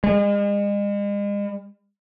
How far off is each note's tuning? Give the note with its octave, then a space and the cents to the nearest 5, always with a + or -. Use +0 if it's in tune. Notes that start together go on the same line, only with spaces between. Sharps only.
G#3 -40